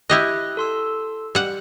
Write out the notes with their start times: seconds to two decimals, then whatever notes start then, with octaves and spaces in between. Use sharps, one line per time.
0.10 E4 G4 D#5 F#6
0.57 A4 C6 E6
1.35 G3 F#5